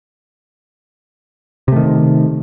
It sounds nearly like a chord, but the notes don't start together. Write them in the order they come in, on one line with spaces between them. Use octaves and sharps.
C3 A3 D#3